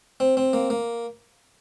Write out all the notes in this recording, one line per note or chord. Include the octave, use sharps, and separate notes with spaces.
C4
C4
A#3
A#3